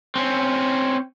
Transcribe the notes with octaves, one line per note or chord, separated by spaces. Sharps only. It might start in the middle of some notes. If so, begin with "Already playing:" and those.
C4 C#4